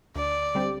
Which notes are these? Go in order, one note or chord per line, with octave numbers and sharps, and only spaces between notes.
D2 D5
D3 G3 C4 G4